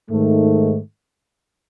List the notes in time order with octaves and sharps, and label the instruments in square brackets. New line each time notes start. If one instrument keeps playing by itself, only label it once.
[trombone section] G#2 D#3 A3